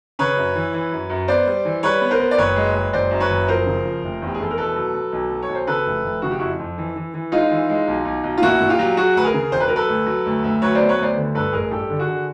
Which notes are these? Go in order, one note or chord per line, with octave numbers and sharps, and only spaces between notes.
C#3 B4 C#5
F#2
E3
E3
F#2
F#2
B3 C5 D5
G3
E3
G3 B4 C#5
B3
A#4 C5
B3
D5
F#1 B4 C#5
G#3
G#3
F#1 C5 D5
F#2
B4 C#5
F#1
F3 A#4 C5
C#3
F3
F1
E2
G4
G#4
E2 A4
A#4
B2 A4 B4
F#3
F#3
B1
F#3
C#5
B1
C5
C#3 A4 B4
F1
F1
C#3 F#4
G4
F2 E4 F#4
F2
E3
E3
E3
G#3 D#4 F4
E3
G#3
B1
B1
B1
F4
A#2 E4 F#4
A#2
F4 G4
F#3
F#3 F#4 G#4
D2 B4
G#4 A#4
C#3
E1 C5
B4
F#3 A#4
A4 B4
D2
F#3
D2
D2
F#3 B4 C#5
B3 C5 D5
B4 C#5
D2 C5 D5
D3
G2 A4 B4
A1 G#4 A#4
G2 G4 A4
D3
F#4 G#4
D3